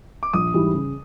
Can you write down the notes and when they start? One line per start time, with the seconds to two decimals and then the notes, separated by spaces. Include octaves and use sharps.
0.23 D6
0.33 A#1 D#6
0.54 G#2 E3 G3
0.74 C#3